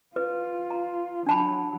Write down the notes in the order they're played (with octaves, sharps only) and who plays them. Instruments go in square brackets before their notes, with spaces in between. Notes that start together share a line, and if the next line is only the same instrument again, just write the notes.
[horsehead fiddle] F4 [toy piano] B4
[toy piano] A#5
[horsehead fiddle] F#3 [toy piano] D4 A5 B5